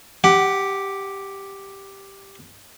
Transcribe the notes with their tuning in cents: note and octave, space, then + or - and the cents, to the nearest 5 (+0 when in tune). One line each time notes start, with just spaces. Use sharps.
G4 +0 F#5 +25